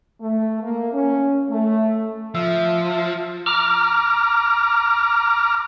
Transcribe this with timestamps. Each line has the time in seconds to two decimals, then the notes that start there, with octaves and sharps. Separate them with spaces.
0.20 A3
0.61 A#3
0.92 C#4
1.49 A3
2.34 F3 E5
3.46 A#5 D6 F6